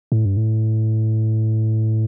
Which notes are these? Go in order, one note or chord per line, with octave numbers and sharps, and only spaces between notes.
A2
G2
A2